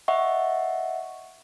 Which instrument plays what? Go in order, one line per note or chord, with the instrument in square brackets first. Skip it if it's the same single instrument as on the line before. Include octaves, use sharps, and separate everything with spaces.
[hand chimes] D#5 E5 F#5 C#6